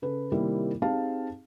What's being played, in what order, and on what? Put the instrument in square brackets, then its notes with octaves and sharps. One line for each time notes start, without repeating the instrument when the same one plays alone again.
[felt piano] C#3 A4 B4
C3 D#3 G3 A#3 C4 E4
C4 D#4 G4 G#4 F5 A5